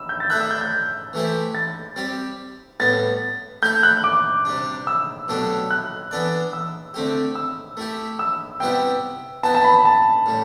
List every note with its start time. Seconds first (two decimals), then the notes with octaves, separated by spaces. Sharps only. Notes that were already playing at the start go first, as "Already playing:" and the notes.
Already playing: E6
0.09 G6
0.20 A6
0.30 A3 D4 A4 E5 F#6
0.41 E6
0.51 G6
0.61 G6
1.13 E3 A3 E4 G4 C5
1.55 A6
1.96 G3 C4 G4
2.80 A2 G3 B3 A6
3.62 A3 E4 A4 G6
3.83 F#6
4.04 D6
4.45 C3 G3 D4
4.87 E6
5.28 B2 F#3 A3 D4 G4
5.71 F#6
6.11 E3 B3 D4 A4 D5
6.53 E6
6.94 D3 A3 C4 G4
7.35 E6
7.77 A3 E4 G4
8.19 E6
8.60 C3 G3 B3 E4 G4 G5
9.43 B3 E4 G4 A5
9.55 A5
9.64 B5
9.85 A5
10.26 A2 G3